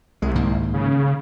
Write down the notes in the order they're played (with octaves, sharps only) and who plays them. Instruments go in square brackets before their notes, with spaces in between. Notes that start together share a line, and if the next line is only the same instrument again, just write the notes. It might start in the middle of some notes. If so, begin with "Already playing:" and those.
[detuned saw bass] C2 [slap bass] G#3
[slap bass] G#2 D#3 A#3
[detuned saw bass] C#3